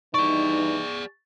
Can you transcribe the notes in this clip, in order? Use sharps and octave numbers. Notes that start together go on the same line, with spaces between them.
G2 E3 D#4 G#4 D5 C#6